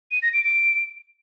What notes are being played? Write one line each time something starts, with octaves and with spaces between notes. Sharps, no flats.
D#7
A#6
D7
D7